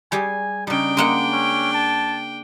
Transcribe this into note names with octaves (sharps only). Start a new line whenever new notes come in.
G3 G4 G#4 G#5
C#3 G3 D4 D#4 G5
G#3 A#3 F#5
C#4
A5